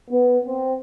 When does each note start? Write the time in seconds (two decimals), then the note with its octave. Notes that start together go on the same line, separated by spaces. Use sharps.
0.10 B3
0.45 C4